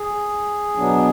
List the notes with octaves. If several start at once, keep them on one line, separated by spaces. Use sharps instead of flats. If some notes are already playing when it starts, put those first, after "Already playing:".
Already playing: G#4
B2 F#3 B3 D4